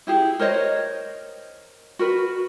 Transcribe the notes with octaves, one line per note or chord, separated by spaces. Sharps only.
E4 G4 G#4
A#4 C5 C#5 D#5
F#4 A#4 B4